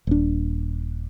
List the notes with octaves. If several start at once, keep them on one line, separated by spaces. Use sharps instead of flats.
D#1 D4